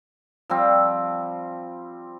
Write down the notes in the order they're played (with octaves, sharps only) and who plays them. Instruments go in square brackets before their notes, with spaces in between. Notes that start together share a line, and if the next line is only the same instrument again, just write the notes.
[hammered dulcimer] F3 G3 C4